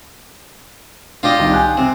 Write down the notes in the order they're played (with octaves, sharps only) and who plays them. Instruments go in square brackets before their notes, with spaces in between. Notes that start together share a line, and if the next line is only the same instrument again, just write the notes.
[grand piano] D4 [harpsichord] F4 G4 D#5
[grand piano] C2 D#3
G#5 F#6 G6
[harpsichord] C3